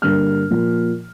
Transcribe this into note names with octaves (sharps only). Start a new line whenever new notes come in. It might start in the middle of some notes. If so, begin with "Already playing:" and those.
G2 D3 G3 A#3 F6
A#2 F3 A#3